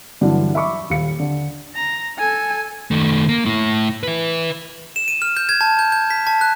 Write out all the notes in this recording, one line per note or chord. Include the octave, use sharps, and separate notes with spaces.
G2 D3 E3 F#3 G3 D4
E5 B5 C#6 D6
D#1 F5 C#7
D3
A#5
A4 G#5
D#3 A3
A#3
A3 E4
B4 E5
E7
D#7
F6
G6
G#6
A5
G6
G6
B6
A5
F#6